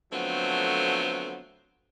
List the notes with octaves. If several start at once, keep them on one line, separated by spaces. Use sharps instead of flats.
D3 F3 F#3 A3 B3 C4